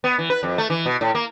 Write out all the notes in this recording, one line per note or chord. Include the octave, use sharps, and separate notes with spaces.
B3
E3
B4
F2
A3
E3
B2
A2
A#3